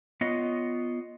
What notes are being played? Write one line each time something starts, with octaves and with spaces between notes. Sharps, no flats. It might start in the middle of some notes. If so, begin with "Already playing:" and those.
B3 F4 C#5 D#5